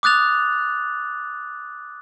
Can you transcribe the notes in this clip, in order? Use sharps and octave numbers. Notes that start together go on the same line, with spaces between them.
D6 D#6 F#6 A6 F7